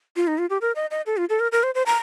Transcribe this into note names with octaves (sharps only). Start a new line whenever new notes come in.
F4
D#4
F4
G4
A#4
D#5
D#5
A4
F4
A4
A#4
A#4
C5
C5
A#5